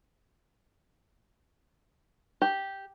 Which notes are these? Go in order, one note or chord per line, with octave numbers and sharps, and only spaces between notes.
G4